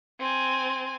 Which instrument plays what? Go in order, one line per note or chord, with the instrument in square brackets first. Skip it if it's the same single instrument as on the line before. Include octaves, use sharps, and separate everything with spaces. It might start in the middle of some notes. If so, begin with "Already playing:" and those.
[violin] C4 G#5